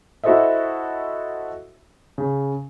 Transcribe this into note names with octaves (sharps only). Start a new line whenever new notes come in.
E4 F#4 A4 C5 D#5 E5
C#3